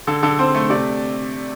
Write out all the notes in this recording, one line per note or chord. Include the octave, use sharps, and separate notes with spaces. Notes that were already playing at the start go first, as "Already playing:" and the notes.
D3 A4
D3 A4
C4 C5
A3
C3 D5